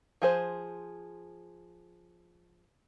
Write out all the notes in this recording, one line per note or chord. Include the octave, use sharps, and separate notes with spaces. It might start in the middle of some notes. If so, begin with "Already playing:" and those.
F3 G#4 C5